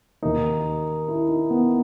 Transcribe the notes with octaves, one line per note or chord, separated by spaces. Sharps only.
D#2 D#3 D#4
E4
D#4
B3